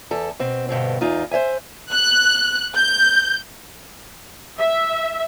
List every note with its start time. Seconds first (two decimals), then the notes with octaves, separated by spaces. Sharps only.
0.11 E2 A4
0.39 B2 C4
0.69 G2 B2 D3 C4
1.01 E2 D#4 F4
1.31 C5 C#5 E5 G#5
1.93 F#6
2.75 G6
4.58 E5